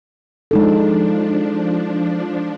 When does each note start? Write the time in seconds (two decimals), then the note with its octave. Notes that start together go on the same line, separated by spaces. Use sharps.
0.51 F3 G#3 D4 D#4 A4